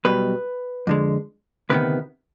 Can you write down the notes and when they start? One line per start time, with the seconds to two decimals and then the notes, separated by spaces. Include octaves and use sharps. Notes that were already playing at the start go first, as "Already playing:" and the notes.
0.05 B1 B2 G3 B4
0.87 F2 D3 G#3
1.70 D2 C3 D#3 B3 B4